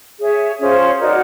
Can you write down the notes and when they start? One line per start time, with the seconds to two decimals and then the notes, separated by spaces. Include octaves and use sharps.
0.20 G#4 C#5 E5
0.60 C#4 F4 G#4 C5
0.99 D#4 F#4 A#4 D5